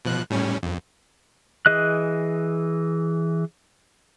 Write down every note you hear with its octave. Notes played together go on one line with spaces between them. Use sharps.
B2 F3 F#6
A2 G3 C#4
F2
E3 G#4 D#5 F#6